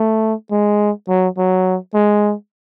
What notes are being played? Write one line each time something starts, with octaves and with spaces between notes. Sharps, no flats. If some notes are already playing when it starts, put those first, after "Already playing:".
Already playing: A3
G#3
F#3
F#3
G#3